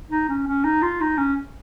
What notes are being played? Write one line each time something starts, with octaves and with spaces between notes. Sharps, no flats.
D#4
C#4
C#4
D#4
F4
D#4
C#4